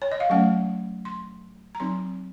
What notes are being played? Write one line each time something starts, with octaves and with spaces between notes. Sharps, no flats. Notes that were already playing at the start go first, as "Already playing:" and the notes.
C#5
D#5
F5
F#3 A3 C#4 F#5
C6
A#5
F#3 C4 D#4 C6